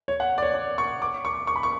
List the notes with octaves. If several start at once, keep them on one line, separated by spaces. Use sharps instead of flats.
C#5
F#5
D5
C#5
D5
C#6
D6
C#6
C#6
B5
C#6